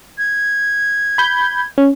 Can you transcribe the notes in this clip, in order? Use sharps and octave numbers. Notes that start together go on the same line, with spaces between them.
G#6
B5 G6
C#4